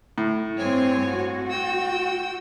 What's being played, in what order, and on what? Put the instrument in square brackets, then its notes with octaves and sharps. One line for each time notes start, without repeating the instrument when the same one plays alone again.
[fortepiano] A2
[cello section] G2 C4 [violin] C#5 G#5
[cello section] F#4
[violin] G5 E6